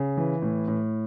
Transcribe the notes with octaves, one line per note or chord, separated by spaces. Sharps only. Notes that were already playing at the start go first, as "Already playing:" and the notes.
Already playing: C#3
E3
A2
A2